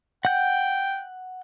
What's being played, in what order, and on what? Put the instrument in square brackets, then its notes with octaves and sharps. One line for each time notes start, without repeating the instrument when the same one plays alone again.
[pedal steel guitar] F#5 G6 [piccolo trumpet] G5